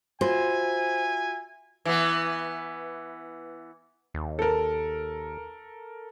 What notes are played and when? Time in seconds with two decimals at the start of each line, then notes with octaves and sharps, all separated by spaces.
0.21 F4 F#4 C5 E5 G#5
1.85 E3 B3
4.14 D#2
4.39 A4 A#4